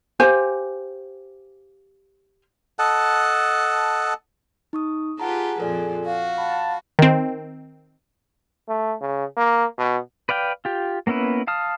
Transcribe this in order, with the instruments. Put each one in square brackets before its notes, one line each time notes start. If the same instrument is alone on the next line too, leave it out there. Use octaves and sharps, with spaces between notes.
[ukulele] G4 C5 F5 G#5
[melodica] A4 D#5 F#5 A5
[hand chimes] D#4 C#6 D#6
[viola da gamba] F4 G4 B4 [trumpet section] G#4 [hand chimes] F#5 A5 A#5
[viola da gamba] F2 A#2 F3 [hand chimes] A4 D5 G#5
[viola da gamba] F#4 [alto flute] F5
[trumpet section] F#5 A5 [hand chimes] B5
[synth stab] D#3 C4
[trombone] A3
C#3
A#3
B2
[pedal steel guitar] B4 D5 F5 G5
F4 G4
A#3 B3 C#4 E4 B4
F5 A5 D#6 F6